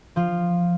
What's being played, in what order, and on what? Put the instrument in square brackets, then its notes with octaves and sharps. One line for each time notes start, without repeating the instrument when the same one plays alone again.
[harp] F3 F4